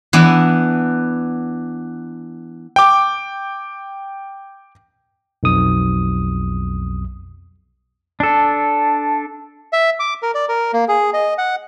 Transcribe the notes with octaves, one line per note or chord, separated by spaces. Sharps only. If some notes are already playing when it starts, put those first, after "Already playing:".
E3 B3 D4 E5
G5 D6
B1 F2 D#6
D4 A4
E5
D6
A#4
D5
A#4
A#3
G#4
D#5
F#5